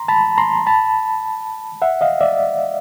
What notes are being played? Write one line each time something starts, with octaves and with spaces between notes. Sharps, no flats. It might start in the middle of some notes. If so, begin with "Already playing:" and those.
Already playing: A#5 C6
A5 B5
A#5 C6
A5 B5
E5 F#5
D#5 F5
D5 E5